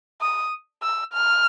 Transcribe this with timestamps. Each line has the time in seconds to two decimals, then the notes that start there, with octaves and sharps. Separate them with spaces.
0.21 D#6
0.83 E6
1.13 F6